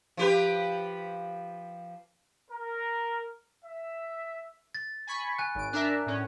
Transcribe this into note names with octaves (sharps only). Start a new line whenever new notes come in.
F3 G4 B4
A#4
E5
A6
G#5 B5 C#6
G#5 F#6
G#1 D7
D4 A#4 E5 F#6
A2 C#4